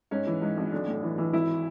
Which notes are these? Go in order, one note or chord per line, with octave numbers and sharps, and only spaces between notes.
G#2 C#4
E3
G#2
G#1
B1 D4
A2
E3
E3
G#1 E4